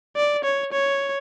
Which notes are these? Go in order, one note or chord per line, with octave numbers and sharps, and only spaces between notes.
D5
C#5
C#5